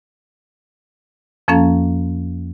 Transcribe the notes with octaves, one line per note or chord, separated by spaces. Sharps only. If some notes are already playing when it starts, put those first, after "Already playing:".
F2 F3 A#3 C#4 A4 F5